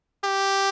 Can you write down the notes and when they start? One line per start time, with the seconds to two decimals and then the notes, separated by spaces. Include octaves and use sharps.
0.25 G4